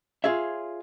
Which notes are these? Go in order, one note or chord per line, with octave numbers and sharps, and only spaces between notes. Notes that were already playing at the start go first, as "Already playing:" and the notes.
F4 G#4 C#5 E5